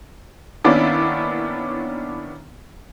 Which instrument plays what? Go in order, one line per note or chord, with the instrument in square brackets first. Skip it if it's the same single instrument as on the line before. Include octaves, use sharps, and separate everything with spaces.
[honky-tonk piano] D#3 A#3 B3 C#4 D4 E4